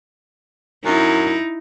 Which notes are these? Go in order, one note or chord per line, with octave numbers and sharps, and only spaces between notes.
F#2 D#4 E4